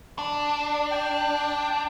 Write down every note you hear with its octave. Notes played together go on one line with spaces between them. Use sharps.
D4
G5